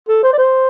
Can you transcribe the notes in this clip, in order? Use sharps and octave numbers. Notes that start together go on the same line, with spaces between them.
A4
C5
D5
C5